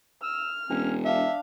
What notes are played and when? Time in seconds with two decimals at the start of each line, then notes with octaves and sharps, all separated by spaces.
0.23 E6 F6
0.70 E1 C#4
1.05 D4 E5 F5